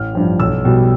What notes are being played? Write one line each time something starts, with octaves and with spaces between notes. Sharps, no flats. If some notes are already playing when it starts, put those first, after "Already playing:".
Already playing: A1 F6
G2 F3
B1 E6
B2 G3